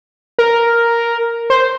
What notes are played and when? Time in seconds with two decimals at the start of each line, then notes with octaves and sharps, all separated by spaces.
0.39 A#4
1.50 C5